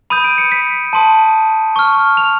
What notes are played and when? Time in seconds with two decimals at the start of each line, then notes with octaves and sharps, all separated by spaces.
0.10 B5 D#6 G6 D#7
0.24 D7
0.38 C#7
0.52 B6
0.93 A5 C6 D#6
1.76 C#6 F6
2.17 F7